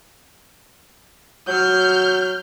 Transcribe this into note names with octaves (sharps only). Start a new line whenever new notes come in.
F#3 F6 G6